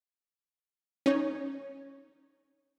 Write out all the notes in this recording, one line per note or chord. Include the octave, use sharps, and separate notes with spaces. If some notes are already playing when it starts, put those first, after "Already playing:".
C#4 D#4 C#5